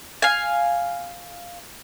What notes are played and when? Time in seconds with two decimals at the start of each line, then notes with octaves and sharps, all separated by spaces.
0.22 F5 G#5